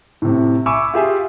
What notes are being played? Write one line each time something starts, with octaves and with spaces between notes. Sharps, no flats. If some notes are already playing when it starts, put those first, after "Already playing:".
A2 C3
E5 G#5 B5 C#6 D6 E6
F4 G4 G#4 E5 G#5